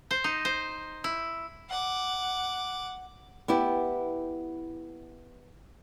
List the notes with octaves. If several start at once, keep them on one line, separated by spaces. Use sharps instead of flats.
C5
D#4
C5
E4
F#5 D6
B3 E4 G4